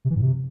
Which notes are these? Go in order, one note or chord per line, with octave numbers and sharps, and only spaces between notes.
C3
E3
G#2
C3